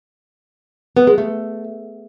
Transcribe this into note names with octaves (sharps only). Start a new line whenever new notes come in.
B3
G#3
A3